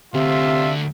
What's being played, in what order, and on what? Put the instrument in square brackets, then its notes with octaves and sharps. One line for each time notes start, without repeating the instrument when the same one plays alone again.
[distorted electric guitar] D2 [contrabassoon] C3 [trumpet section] F4 E5